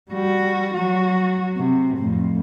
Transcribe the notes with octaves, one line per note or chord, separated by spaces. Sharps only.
G3 F#4
F#3 F#4
C3
F2 A2